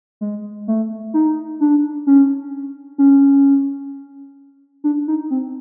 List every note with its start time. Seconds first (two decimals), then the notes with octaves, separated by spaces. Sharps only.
0.21 G#3
0.67 A3
1.14 D#4
1.61 D4
2.07 C#4
2.98 C#4
4.84 D4
5.08 D#4
5.30 C4